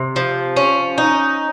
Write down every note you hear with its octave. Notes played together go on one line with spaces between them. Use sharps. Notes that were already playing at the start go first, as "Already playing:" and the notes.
Already playing: C3
F3
C#4
D#4